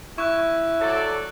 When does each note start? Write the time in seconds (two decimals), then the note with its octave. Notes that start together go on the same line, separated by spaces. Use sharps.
0.18 E4 C#6 F#6
0.80 F#3 A4 D5